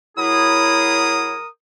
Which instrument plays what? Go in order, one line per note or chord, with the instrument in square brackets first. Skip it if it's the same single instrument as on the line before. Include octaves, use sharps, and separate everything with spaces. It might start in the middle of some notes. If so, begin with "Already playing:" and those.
[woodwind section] F#3 E4 G#4 [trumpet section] A#4 D#6